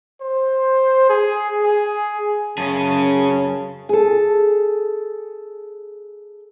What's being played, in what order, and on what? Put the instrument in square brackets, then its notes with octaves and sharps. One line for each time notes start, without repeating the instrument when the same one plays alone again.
[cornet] C5
G#4
G#4
[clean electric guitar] F#2 [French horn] C#3 [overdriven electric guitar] C#4 G#4 [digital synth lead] A5
[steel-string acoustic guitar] G#4 A4